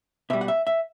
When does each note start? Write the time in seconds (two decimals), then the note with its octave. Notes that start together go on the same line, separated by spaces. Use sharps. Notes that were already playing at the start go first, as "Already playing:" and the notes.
0.30 B2 G3 E5
0.41 F#5
0.48 E5
0.67 E5